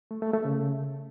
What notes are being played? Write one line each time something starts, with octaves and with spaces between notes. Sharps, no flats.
A3
A3
A3
C#3